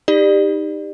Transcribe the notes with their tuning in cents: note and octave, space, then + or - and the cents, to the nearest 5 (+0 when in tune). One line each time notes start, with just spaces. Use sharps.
D#4 +0 G4 +20 D5 +30